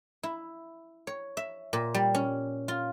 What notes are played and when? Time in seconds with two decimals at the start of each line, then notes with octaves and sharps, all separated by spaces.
0.23 E4
1.07 C#5
1.37 E5
1.73 A#2
1.94 G3
2.15 C#4
2.68 F4